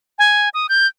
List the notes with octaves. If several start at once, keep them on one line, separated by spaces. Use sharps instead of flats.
G#5
D#6
G6